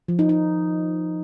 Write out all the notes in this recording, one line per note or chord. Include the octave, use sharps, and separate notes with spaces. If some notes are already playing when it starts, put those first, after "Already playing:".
F3
D#4
D#4